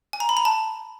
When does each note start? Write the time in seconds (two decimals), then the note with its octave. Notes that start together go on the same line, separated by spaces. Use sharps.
0.13 G#5
0.20 A#5
0.29 B5
0.37 A#5
0.45 A5